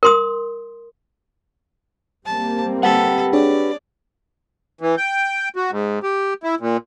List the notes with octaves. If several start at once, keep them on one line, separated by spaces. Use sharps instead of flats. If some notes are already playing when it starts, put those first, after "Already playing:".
A#4 C6 D#6
G3 A#3 C4 A5
G4 A4 B4 F#5
D4 G#4 C#5 D5
E3
G5
F#4
G#2
G4
E4
A#2